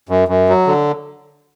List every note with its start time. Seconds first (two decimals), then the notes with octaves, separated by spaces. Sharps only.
0.09 F#2
0.28 F#2
0.49 F#3
0.67 D3